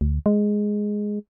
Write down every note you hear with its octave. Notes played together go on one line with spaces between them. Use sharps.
D2
G#3